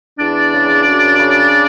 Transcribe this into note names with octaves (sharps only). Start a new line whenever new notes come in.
E2 D4 D5
C#3
F#2
C#3